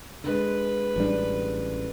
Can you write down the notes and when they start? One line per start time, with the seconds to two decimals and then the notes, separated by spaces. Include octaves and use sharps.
0.24 D3 G#3 B4
0.96 A1 G3 D4